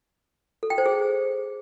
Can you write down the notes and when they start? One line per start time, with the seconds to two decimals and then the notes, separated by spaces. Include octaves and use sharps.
0.63 A4
0.70 G5
0.78 C5
0.86 G#4